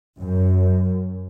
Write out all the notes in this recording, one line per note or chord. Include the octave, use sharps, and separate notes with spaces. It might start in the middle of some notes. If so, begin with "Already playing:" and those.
F#2